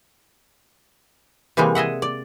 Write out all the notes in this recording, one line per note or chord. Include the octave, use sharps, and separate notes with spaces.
C3 E3 G3 G#3 A#3
G#4 D#5 E5 F#5
D5